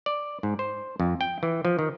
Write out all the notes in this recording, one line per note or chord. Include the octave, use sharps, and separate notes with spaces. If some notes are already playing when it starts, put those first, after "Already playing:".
D5
G#2
C5
F2
G5
E3
F3
D#3